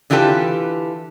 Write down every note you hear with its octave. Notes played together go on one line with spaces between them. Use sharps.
D3 E3 F4 G4 A4 B4